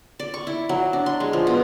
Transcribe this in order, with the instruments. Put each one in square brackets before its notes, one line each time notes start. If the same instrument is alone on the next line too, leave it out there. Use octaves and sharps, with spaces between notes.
[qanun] D5
C#6
E4
F#3
D4
C6
G#3
F3
B2